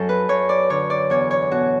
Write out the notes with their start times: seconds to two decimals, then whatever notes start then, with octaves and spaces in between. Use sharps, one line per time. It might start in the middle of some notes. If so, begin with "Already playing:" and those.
Already playing: F#2 F#3 A4
0.09 B4
0.29 F#2 C#5
0.49 D5
0.70 D3 C#5
0.90 D5
1.10 E2 C#5
1.31 C#5
1.51 B2 F#4